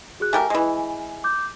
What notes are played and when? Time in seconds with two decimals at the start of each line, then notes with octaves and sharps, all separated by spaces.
0.20 F#4 G#4 F#6
0.33 A3 G4 A#4 G#5
0.50 E3 G#3
1.24 D6 G6